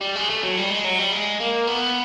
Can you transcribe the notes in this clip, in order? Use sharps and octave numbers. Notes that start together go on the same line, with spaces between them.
G3
G#3
A3
F#3
G3
G#3
F#3
G3
G#3
A#3
B3